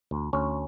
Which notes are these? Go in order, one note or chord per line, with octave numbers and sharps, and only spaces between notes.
D2
D2 C#4